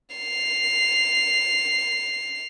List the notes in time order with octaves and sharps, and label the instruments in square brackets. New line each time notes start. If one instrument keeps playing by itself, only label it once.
[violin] C7 F7